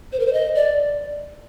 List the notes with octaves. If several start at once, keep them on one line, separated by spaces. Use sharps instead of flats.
C5
A#4
C5
D#5
D5